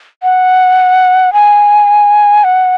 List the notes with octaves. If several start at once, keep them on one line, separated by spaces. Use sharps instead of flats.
F#5
G#5
F#5